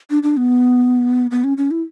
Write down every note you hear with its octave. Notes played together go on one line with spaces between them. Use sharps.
D4
D4
B3
B3
C#4
C#4
E4